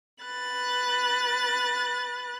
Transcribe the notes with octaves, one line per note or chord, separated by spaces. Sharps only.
B4 F#6 A6